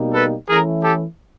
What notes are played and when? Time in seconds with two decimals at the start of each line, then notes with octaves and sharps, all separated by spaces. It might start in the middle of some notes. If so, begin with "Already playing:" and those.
Already playing: B2 G3 A#3 D#4
0.14 A4 B4
0.48 E3 A3 C#4 E4 G#4 A#4
0.82 G4 A4